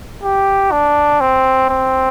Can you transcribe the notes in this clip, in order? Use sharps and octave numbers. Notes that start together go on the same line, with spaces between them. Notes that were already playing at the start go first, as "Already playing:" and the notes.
G4
D4
C4
C4